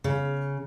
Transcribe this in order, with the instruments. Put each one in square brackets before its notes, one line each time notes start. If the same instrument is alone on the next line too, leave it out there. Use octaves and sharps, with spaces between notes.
[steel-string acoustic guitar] C#3